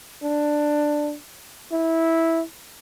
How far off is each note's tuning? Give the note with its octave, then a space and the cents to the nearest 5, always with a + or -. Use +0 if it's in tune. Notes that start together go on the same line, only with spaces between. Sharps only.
D4 +10
E4 -10